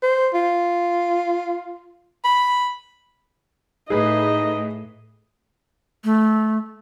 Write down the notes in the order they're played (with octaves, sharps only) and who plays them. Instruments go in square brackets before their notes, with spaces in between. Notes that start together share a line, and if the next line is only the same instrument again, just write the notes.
[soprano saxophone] C5
F4
B5
[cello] A2 A3 [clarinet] D#4 [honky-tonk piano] G#4 B4 [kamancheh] D#5
[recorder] A3